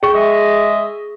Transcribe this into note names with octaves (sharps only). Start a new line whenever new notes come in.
G#4 G5 C#6
G#3 D#5 E5